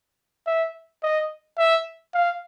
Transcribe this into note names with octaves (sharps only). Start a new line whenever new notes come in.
E5
D#5
E5
F5